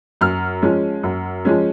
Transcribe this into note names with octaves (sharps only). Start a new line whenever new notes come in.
F#2 F6
F3 G#3 C#4
F#2
F3 G#3 C#4